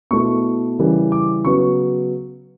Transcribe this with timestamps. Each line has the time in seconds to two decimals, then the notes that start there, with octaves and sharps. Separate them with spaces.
0.11 B2 A3 E4 C#6
0.79 C#3 E3 G3
1.12 D6
1.44 C#3 F#3 B3 C#6